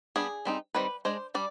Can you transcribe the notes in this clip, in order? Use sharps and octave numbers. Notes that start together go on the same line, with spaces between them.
G3 B3 D4 G#4
G3 C4 D#4
D#3 G3 C4 B4
G#3 D4 C5
G3 D4 D5